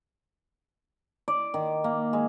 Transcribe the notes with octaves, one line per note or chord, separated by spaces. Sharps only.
D5
D#3
A#3
G#3